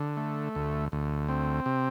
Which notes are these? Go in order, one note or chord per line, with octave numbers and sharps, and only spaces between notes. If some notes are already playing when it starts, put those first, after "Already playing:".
Already playing: D3
A3
D2
D2
C4
C3